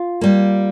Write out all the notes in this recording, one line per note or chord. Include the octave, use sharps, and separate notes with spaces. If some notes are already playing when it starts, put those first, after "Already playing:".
Already playing: F4
G3 A#3